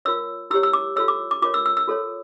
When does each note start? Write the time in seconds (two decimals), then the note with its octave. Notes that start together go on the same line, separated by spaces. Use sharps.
0.05 F4 A#4 C#5 E6
0.51 E4 G4 C#5 E6
0.63 E6
0.73 D6
0.96 F4 A4 C#5 E6
1.08 D6
1.31 D6
1.42 F4 A#4 C#5 D6
1.54 E6
1.66 E6
1.77 E6
1.87 F4 A4 C#5